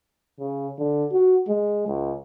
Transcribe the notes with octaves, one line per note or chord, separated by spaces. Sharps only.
C#3
D3
F#4
G#3
C#2